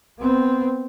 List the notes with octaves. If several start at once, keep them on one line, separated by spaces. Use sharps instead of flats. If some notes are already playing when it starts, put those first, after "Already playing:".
B3 C4